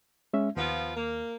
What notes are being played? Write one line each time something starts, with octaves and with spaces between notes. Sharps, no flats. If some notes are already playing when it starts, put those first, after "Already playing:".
G#3 C#4 E5
D#2 F3 B3 F4
A#3